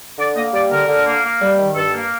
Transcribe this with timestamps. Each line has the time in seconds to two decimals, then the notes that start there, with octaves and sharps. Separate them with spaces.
0.18 D3 D5
0.35 A#3 D#5
0.53 G3 D5
0.71 D3 A#4
0.88 D3
1.05 A#3
1.23 A#3
1.41 G3
1.59 D#3
1.76 G2 A4
1.94 A#3